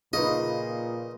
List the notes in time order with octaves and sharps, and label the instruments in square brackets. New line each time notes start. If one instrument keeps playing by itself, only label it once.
[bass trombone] A#2 [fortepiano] C#3 D#4 [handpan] F4 B4 [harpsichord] D#5